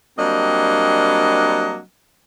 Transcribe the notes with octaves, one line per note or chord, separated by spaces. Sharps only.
F#3 G3 A#3 C4 D4 D#5